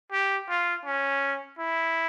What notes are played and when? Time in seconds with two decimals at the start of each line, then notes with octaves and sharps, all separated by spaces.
0.12 G4
0.49 F4
0.85 C#4
1.59 E4